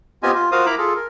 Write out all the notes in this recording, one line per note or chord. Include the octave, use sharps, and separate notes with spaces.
B3 C4 F4 G4 D#5 G#5
F4
F4 F#4 A#4 C5 F5 D#6
E4 A#4 A#5 B5 D6
F4 G#4 A4
A#4